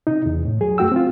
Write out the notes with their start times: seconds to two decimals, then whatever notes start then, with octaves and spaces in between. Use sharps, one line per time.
0.07 C3 D#4
0.26 E2
0.45 A2
0.61 F#3 G#4
0.78 F#2 A3 F#4 G5 E6
0.92 C4 F4